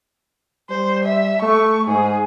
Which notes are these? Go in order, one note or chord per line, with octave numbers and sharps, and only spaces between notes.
G3 C5
E5
A3 C#6
G#2 G#4